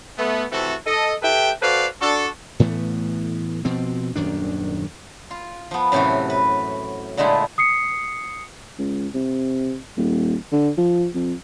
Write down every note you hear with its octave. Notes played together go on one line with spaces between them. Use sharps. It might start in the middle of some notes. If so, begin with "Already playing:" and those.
A3 B3
C3 E3 A3 C4 F#4 A4
A4 D#5
G4 A4 B4 E5 G5
F#4 A4 B4 C5 D5 F5
D4 F#4 A4
A2 E3 A3 B3
B2 F3 C4
D#1 F#2 D#3 D4
F4
F3 B3
F#2 A2 C3 E3 F#4
B4
A#2 D3 G#3 A3 E4 F4
D#6 C7 C#7
C#2
C3
D#1
D3
F3
F2